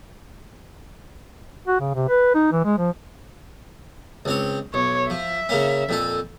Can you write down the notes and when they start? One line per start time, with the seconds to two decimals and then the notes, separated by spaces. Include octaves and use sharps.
1.67 F#4
1.80 C#3
1.94 C3
2.09 B4
2.35 D#4
2.52 E3
2.65 G#3
2.78 F3
4.25 C#2 C4 C#5
4.74 B1 C#5
5.10 F3 E5
5.49 C#3 A#3 C#4
5.89 F2 A#2 A4